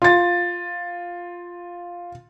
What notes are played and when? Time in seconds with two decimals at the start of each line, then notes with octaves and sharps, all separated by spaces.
0.02 F4 A6